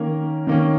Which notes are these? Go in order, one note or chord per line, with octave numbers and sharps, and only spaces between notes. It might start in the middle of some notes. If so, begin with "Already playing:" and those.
Already playing: D#3 A#3 C#4 A#4
D#3 A#3 C#4